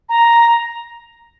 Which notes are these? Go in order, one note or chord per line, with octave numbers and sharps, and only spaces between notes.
A#5